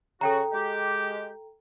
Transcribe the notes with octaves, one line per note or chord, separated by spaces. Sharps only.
C#3 F#4 A4 G5 A#5
G#3 G4